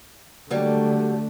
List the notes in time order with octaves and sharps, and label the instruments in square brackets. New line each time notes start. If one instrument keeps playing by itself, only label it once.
[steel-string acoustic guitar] D#2 F#3 G3 [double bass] D3 A3